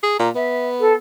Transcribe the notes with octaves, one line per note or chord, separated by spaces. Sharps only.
G#4
A#2 A#5
B3 E5
A4